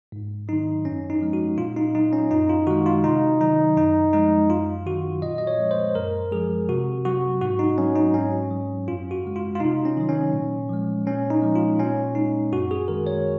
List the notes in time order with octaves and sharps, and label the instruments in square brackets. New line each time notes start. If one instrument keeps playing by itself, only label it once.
[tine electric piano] G#2
D#3 F#3 D#4
F#2 C#4
D#4
F3 G#3
F#4
A#2 F4
D#4
F#3 D#4
C#4
F#2 D#4
F4
D#3 G#3 F#4
F4
C3 D#4
D#3 F#3 D#4
F#2 D#4
F3 G#3 D#4
F#2 F4
D#3 F#3 F#4
A#2 D#5
D#5
C#5
F3 G#3
C5
F#2 A#4
F3 G#3 G#4
C3 F#4
F#3 F#4
G#2 F#4
D#4
F#3 C#4
D#4
G#2 C#4
F#3
F#2 F4
F#4
C#3 G#3
F4
F4
C3 D#4
C#4
D#3 F#3
C#4
A#2
F3 G#3
A#2 C#4
D#4
F3 G#3
F4
A#2 C#4
G#3 D#4
F#2 F#4
G#4
D#3 G#3 A#4
C#5